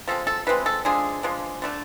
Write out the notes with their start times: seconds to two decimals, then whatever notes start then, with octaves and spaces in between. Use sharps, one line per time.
0.08 F3 G#3 C4 A4
0.27 A4
0.47 F3 G#3 C4 B4
0.66 A4
0.85 F3 G#3 D4 G#4
1.23 F3 G#3 D4
1.62 D3 A3 D4